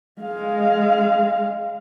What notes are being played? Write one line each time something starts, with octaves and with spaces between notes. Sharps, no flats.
G#3 F5